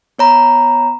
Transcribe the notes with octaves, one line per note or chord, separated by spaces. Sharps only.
B3 C#5 A#5 B5